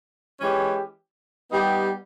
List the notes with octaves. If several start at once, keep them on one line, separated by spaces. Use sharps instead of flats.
E3 G#3 C#4 G4
G3 B3 D#4 G4